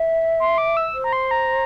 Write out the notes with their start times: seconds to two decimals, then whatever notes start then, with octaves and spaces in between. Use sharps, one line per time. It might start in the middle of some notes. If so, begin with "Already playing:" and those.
Already playing: E5
0.40 C6
0.58 D6
0.77 E6
0.94 C5
1.04 A#5
1.13 C6
1.31 A#5